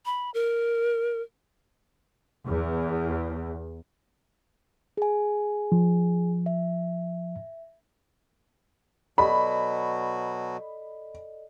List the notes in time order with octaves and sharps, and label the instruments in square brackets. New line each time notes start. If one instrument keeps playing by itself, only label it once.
[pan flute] B5
A#4
[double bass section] E2
[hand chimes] G#4 G#5
[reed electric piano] F3
[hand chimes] E5
[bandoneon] B2 F#3 F#4 [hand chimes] A4 D5 D#5 [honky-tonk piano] B5